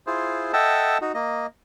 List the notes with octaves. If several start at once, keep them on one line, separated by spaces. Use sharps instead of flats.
E4 F4 G#4 C5
A4 D#5 E5 F#5 G5 A5
D#4 F#4
A#3 D#5